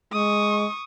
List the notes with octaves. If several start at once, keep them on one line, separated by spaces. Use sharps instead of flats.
G#3 C#6 D#6